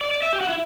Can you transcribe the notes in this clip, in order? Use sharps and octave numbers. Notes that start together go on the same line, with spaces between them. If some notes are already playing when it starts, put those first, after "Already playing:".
D5
D5
E5
G4
F#4
E4